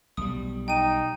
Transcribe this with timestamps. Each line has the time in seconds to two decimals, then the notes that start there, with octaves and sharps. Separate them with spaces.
0.17 B1 G3 D#6
0.68 D#4 G5 D#7